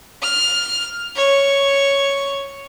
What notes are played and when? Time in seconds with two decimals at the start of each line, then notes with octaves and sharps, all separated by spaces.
0.22 F6
1.16 C#5